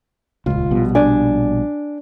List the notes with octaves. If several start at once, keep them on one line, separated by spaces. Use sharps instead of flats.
D#1 C#2 F4
A#1 B2 G3
D4 D5 G#5